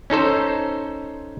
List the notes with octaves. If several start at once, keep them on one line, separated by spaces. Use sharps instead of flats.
C#4 D#4 A4 C5